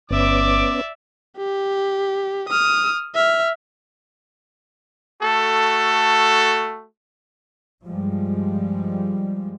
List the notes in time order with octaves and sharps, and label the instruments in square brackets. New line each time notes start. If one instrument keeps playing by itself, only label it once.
[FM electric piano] G1 [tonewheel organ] B3 C#4 [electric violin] D5 E5 [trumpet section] D6
[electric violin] G4
D#6 F6
E5 F6
[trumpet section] A3 F#4 A4
[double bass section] G2 F3 G3 G#3